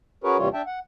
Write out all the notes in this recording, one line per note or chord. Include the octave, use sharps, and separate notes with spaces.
C#4 F#4 G#4 A#4 B4 C#5
D#2 C3 E3 G3 F4 C#5
D4 E5 G5 A5
F#5